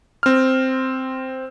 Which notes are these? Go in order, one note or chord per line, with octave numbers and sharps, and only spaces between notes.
C4 F6